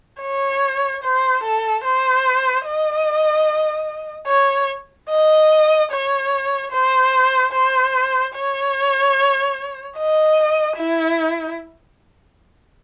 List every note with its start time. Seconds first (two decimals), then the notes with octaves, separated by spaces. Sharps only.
0.21 C#5
1.03 C5
1.43 A4
1.85 C5
2.66 D#5
4.27 C#5
5.09 D#5
5.91 C#5
6.71 C5
7.52 C5
8.35 C#5
9.97 D#5
10.77 E4